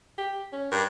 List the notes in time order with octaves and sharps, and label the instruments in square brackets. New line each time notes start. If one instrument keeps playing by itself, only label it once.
[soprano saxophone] G4
C#4
[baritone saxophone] G2 [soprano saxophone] A#4